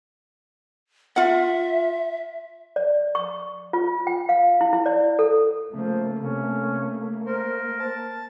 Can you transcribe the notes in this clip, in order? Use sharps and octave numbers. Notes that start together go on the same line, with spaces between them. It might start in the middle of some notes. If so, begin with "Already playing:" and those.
F4 E5 F#5
D5
C#6
F4
G5
F5
E4
E4
D5
A4
C#3 F3 A3 A#3
C3 C#4
A#4 C5
A5